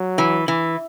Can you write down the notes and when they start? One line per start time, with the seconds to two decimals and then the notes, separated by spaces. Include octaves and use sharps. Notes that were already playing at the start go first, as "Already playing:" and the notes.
Already playing: F#3
0.18 E3
0.48 E3